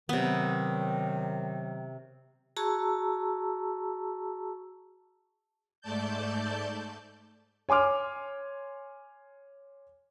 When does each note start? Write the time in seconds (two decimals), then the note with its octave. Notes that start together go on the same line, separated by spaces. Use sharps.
0.09 C3 D#3 F#3 B3
2.57 F#4 G#4 A5 A#5 C#6 E6
5.81 G#2 A3 D5 A5 G6
7.69 C#5 G#5 C6 D6 F6